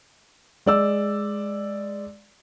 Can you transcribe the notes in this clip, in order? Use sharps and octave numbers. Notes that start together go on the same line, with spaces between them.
G#3 D5 E6